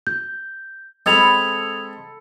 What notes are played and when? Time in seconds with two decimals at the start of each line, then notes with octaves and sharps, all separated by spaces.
0.07 G6
1.06 G#3 C4 A4 B5 D#6 G#6 F7